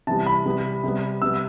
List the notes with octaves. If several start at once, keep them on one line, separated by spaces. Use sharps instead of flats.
C3 E3 G3 B3 A5
B5
C3 G3 B3
C3 G3 B3
C3 G3 B3 E6